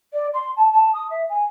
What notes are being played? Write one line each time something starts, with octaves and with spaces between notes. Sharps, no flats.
D5
C6
A5
A5
D#6
E5
G#5